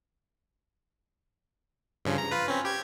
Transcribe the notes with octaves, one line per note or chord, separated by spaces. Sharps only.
G2 C#3 F3
A#5
F4 B4
C4 C#4
G4 G#6